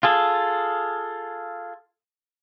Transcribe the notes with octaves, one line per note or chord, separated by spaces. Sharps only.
F4 G#4 A4